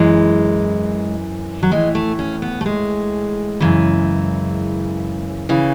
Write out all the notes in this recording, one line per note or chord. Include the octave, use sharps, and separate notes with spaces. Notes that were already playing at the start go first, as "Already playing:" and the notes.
Already playing: F#2 E3 G#3
F#3
A2 E3 G#3
A3
C#4
B3
A3
G#3
F#2 C#3 E3
C#3 E3